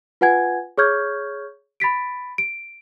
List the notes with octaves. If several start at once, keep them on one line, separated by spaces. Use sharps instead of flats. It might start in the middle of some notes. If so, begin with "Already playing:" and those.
F4 B4 F#5 G#5 G#6
G#4 C#5 C#6 F6 G6 G#6
B5 A6 B6 D7
D7